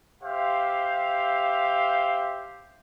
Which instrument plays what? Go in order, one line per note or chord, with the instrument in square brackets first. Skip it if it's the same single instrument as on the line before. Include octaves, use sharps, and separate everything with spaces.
[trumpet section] G4 C5 E5 F5